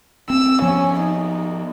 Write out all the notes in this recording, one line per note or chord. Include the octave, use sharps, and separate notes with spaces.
C4 E6
F3 B3 C#4
D#4